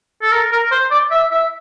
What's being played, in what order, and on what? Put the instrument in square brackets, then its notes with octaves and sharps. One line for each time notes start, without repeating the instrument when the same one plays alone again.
[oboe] A4
A#4
A#4
C5
D5
E5
E5